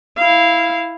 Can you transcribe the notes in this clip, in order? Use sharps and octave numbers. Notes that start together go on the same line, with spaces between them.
E4 F5